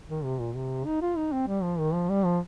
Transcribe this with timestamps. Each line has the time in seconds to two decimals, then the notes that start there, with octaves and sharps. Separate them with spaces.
0.09 D#3
0.24 C3
0.40 A#2
0.55 C3
0.86 D#4
1.02 F4
1.17 D#4
1.32 C4
1.47 G3
1.63 F3
1.79 D#3
1.94 F3
2.09 G3
2.25 F3